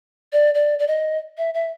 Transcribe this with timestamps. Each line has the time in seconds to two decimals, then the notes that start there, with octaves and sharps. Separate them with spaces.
0.33 D5
0.55 D5
0.79 D5
0.87 D#5
1.38 E5
1.54 E5